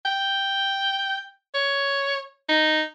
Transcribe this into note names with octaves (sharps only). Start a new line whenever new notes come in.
G5
C#5
D#4